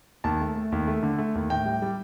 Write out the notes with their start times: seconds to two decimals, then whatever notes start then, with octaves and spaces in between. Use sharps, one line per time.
0.24 D#2 A5
0.41 A3
0.56 A3
0.72 D#2
0.87 A3
1.03 D3
1.18 A3
1.35 D#2
1.50 A2 G5
1.66 G3
1.82 G3